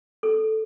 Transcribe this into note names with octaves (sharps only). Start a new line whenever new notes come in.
A4